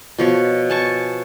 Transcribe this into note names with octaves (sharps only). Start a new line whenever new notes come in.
B2 F3 C#5
G#5 A5 C#6